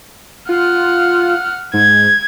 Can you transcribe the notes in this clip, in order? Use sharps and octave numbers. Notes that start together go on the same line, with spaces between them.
F4 F#5 F6
G#2 G#6